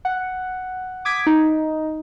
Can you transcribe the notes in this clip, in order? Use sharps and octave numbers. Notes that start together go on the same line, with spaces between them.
F#5
D6 D#6 G#6 B6 D7
D#4